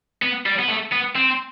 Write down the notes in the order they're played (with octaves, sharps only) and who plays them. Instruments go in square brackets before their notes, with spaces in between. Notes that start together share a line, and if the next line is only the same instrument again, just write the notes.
[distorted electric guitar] B3
G3
B3
A3
B3
C4